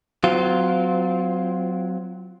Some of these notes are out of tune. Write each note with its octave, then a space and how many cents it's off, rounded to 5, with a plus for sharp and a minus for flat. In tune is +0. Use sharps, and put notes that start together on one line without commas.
F#3 +0 C4 -30 F4 +0